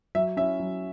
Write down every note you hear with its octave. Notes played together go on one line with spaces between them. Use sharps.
F#3 E5
C#4 E4 E5
F#3